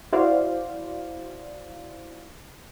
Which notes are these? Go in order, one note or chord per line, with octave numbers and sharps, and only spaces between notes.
E4 F#4 C5 D5 F5